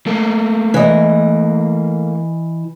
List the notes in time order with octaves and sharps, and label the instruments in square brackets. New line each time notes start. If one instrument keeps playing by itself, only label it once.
[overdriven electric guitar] A3 A#3
[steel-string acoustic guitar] E3 D#5